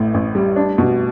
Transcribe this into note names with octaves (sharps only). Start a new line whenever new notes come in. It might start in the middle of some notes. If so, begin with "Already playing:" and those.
Already playing: A1 A2
A1
G3
D4
B2